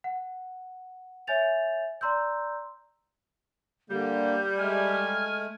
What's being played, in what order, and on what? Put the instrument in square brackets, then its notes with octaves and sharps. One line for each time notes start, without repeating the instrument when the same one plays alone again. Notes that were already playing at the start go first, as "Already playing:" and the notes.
[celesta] F#5
C#5 E5 G#5 G6 A6 F7
D5 A#5 C6 E6 G6
[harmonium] D3 A#3 [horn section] G3 [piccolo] G6
[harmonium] G#3 A3 [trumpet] G#5 [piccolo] F6